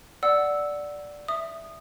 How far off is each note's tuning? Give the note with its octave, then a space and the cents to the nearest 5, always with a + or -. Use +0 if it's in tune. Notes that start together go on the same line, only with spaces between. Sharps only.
D5 +0 F#5 +0 E6 -10
E5 +0 D#6 -20